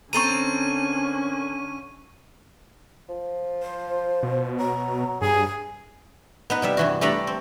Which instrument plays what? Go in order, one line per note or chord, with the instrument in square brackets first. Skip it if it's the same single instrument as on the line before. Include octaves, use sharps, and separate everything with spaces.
[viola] D3 C#4 [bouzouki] C4 A4 A#4 [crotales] C#6 D#7
[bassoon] F3
[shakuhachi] C5
[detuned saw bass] B2
[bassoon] F#3 [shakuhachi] A#5
[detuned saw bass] G2 [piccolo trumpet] G#4 [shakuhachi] G#5
[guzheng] B3 D#4 B4
C3 G3 E5
G2 E3 F#4
G3 A3 D4 A4 A#5 B5
C4